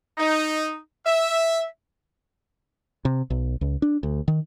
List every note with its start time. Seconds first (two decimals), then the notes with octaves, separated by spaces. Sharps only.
0.18 D#4
1.05 E5
3.05 C3
3.30 B1
3.61 C#2
3.82 D4
4.03 D2
4.28 D#3